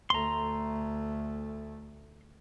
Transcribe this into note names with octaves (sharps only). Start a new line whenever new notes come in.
D2 A3 A#5 C6